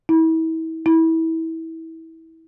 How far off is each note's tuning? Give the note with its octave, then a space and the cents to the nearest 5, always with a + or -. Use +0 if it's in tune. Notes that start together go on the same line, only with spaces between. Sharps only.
E4 -35
E4 -25